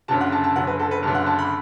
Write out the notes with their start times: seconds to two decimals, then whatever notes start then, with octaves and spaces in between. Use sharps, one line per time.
0.08 F#1 F#2 D3 A5
0.21 F#5
0.32 A5
0.44 A5
0.56 F#1 F#2 D3 F#5
0.67 B4
0.79 A4
0.91 B4
1.02 F#1 F#2 D3 A5
1.14 F#5
1.26 A5
1.39 B5